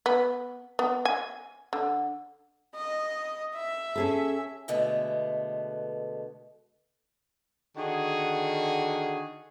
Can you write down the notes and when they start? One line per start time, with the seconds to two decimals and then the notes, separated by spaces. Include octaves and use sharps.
0.06 B3
0.79 B3
1.05 G#5
1.73 D3
2.75 D#5
3.55 E5
3.96 C#4 G#4 A4
4.68 B2 D3 G#3 A3 B3
7.76 D3 D#3 F#4 G#4